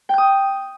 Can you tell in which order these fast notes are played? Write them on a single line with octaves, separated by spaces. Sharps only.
G5 G6 D#6